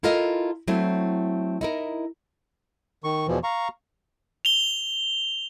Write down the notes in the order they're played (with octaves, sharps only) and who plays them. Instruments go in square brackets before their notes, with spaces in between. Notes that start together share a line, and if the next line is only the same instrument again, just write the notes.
[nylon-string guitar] E4 F4 A4 A#4 D#5 F5
F#3 A3 C4 E4
D#4 E4 A#4
[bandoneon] D#3 C#6
E2 B2 E3 F3
F5 A#5 C#6
[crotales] F7 G7